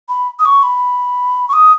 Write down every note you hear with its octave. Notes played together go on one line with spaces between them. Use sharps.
B5
D#6
C#6
B5
C#6
D#6